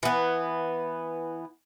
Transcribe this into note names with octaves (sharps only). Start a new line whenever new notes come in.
E3 B3